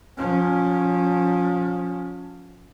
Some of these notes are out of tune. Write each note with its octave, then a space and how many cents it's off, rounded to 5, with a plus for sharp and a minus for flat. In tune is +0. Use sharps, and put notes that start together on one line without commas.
F3 +30 C#4 +5